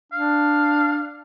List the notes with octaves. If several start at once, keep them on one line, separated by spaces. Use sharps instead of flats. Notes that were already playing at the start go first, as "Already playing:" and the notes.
D4 F5